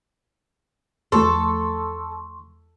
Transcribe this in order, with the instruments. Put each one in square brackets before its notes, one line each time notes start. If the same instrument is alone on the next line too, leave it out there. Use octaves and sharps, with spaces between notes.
[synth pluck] E2 F3 A3 [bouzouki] A4 [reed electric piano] C6 C#6